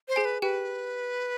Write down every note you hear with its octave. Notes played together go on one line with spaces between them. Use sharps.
C5
G#4 G#5
B4
G4 B4 G5